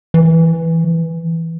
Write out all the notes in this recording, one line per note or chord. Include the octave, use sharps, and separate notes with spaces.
E3